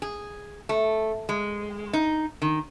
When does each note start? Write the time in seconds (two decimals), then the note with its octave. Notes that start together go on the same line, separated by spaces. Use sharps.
0.02 G#4
0.69 A3
1.29 G#3
1.93 D#4
2.42 D#3